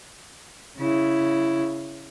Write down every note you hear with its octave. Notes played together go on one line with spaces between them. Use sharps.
C#3 E4